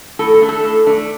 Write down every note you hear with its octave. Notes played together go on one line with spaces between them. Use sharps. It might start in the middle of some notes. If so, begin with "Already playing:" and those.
A2 A4
A4
A3 D4
A4
A2
A3 D4